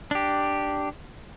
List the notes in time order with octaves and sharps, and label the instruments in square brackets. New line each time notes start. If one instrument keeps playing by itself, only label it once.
[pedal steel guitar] D4 G4